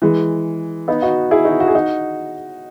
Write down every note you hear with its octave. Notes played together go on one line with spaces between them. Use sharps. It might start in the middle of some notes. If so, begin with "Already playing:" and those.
E3 G#3
B3 D#4
D#4 F#4
E4 G#4
D#4 F#4
F#4
G#4
D#4 F#4